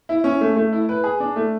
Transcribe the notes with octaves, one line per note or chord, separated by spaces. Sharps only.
E4
C#4
A3
A3
E4
B4
G#4
D4
A3